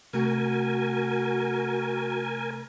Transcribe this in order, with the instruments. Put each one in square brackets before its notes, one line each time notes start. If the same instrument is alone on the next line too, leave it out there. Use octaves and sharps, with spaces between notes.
[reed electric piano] C3 A3 [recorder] F#4 [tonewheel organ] A#4 G#5